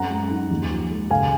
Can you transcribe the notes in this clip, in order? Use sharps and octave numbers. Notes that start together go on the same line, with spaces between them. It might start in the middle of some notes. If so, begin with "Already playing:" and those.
Already playing: F#2 C4 F#5 A#5
G#3
D#4
D#2
F3
G#3
C#2 F5 G#5